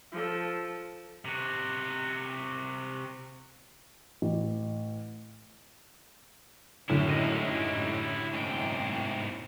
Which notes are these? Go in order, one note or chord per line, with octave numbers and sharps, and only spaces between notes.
F3 A4
C3 F#4
A1
F#2 A2 D3 E4 G4
G#2 D#5
B1 G#2 C3 G5